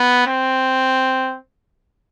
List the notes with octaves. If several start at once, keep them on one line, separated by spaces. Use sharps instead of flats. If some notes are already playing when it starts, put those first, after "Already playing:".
Already playing: B3
C4